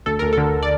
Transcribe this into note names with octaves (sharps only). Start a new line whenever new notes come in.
D2 A4
D2 A#4
D3 A4
D5